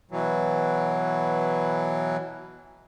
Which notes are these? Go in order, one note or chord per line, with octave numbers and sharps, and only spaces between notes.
B2 E3 F#3